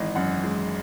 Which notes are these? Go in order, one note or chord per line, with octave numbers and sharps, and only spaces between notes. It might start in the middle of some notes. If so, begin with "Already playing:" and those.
Already playing: G#1 E3 D#5
F#2 F#5
G#3